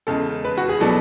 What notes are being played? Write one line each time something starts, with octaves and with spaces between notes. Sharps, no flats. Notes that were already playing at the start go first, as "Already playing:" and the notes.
E2 C#3 G#3 A4
B4
F#4
G#4
B2 F#3 B3 D4 A4